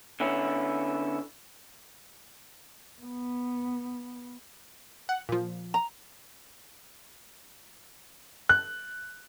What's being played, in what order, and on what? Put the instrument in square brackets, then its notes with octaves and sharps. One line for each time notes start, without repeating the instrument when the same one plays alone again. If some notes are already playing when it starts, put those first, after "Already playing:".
[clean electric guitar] D3 B3 C#4 E4
[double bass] B3
[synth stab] F#5
A#2 F3
[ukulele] A#5
[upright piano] F#6